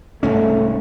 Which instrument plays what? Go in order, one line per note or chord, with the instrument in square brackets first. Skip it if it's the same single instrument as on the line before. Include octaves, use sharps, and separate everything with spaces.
[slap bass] C2 G#2 C#4 [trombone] A3